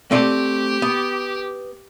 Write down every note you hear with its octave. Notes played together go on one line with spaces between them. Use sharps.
A3 C4 G4 D5
B3